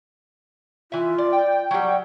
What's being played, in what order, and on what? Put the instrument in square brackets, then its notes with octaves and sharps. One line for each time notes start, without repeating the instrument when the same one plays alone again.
[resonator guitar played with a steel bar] E3 E5 [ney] F4
[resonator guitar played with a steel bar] D5
[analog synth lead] G5
[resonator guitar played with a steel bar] F#3 G3 [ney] F#5